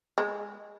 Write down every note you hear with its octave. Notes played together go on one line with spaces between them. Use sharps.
G#3